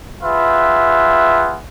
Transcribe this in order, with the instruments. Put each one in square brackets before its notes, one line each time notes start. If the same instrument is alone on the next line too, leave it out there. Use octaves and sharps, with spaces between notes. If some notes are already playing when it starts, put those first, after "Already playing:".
[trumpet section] F4 G#4 B4 E5 F#5